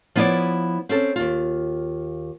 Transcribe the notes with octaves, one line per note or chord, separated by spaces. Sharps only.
F3 B3 E4 C#5 D5
C4 C#4 A4
D#2 F4